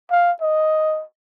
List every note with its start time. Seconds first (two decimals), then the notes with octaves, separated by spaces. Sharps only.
0.11 F5
0.41 D#5